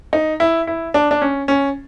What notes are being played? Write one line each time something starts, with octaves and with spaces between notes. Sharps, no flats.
D#4
E4
E4
D4
D4
C#4
C#4